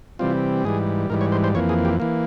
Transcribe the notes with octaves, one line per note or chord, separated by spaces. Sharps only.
C3 E3 G3 C4 F4
G#2 E3 G3 G#4
G#2 E3 G3 A#4
C#5
C5
C5
F2 E3 A#3 C#5
G#4
G4
E3 A#3